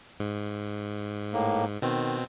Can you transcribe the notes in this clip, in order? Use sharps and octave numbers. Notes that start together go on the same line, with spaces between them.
G#2
A2 A#3
B2 D#3 C4